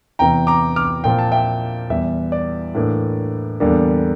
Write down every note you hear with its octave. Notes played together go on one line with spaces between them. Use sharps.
E2 C3 E3 G5 A#5
A#5 D6
D6 F6
A#2 F3 C4 G5
A5
E5 G5
E2 E3 G3 E5
D5
A2 E3 A#3 D4
E2 D3 G3 A#3 D4